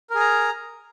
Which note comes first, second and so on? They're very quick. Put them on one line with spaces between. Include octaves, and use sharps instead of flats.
A#4 G#4 A#5